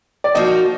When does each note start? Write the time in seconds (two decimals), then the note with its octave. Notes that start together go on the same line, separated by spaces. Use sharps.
0.24 D5
0.35 F3 A#3 D#4 F#4 D#5